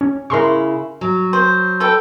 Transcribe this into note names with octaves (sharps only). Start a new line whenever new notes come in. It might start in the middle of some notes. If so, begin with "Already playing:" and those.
C#4
C#3 E4 A#4 C6 C#6
F#3
C5
A4 B4 G5